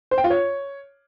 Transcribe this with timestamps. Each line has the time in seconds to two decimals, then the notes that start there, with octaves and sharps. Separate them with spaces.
0.11 C5
0.18 G5
0.24 F4
0.30 C#5